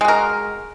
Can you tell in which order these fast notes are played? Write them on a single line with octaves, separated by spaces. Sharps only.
G#3 F#4 A#4